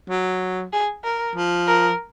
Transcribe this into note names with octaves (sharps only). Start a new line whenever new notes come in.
F#3
G#4
A#4
F3
A#4